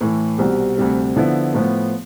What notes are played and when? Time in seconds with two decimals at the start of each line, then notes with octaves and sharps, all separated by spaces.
0.01 A2 E3 A3
0.38 C2 B2 G3 C4 G4
0.77 D2 C3 G3
1.16 D3 F3 B3 E4
1.54 A2 F3 B3